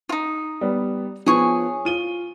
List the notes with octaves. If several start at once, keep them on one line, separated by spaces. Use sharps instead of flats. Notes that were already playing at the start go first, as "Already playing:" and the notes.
D#4 F4
G3 B3
F3 B3 G#4 C#5 G#5
F4 D#7 G7